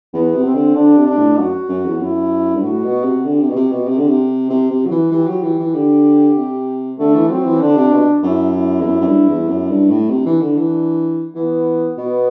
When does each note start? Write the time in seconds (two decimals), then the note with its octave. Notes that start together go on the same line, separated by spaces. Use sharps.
0.13 E2 B3
0.34 C3
0.44 C4
0.55 D3
0.75 D3 D4
0.97 C3
1.07 D4
1.17 A2
1.37 F#2 F#4
1.69 F#2
1.85 E2
2.00 F#2 E4
2.54 G2
2.62 A2 F#4
2.84 B2
3.04 C3
3.24 D3 G4
3.41 C3
3.50 B2
3.56 C3
3.72 B2
3.88 C3
3.98 D3
4.09 C3
4.50 C3
4.70 C3
4.86 F#3
4.90 E3
5.11 E3 G4
5.27 F#3
5.43 E3
5.59 E3
5.74 D3 G4
6.37 C3
6.99 D3 A3
7.14 E3
7.30 F#3 C4
7.46 E3
7.61 D3 D4
7.77 C3
7.92 B2
8.23 F#2 E4
8.54 E4
8.80 E2
8.86 F#2
9.01 F#2
9.06 G2
9.27 E2
9.48 F#2
9.69 G2
9.90 A2
10.10 C3 D4
10.26 E3
10.41 D3
10.56 E3
11.35 E3 B3
11.97 B2 B3